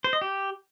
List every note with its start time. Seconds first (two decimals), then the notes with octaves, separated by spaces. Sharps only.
0.04 C5
0.13 D#5
0.21 G4